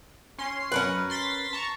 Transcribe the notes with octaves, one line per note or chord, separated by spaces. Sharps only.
C#4 C6
F#2 C#4 A#4 B4
C6 A6 B6
A5 A#5 C#6